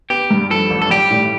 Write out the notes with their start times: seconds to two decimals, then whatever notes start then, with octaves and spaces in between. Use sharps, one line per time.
0.10 B3 G4
0.30 G2
0.51 F3 A4
0.70 A1
0.82 A4
0.90 G3 G4
1.10 A2